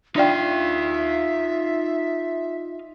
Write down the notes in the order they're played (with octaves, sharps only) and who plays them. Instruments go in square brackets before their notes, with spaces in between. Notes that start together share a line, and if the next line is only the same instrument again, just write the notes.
[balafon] D4 D5 G5 [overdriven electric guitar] D#4 F5 [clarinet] F4 [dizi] E5